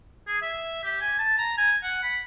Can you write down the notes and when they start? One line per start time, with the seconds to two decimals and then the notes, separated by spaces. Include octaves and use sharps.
0.27 G#4
0.42 E5
0.84 G4
1.01 G#5
1.18 A5
1.38 A#5
1.57 G#5
1.83 F#5
2.03 B5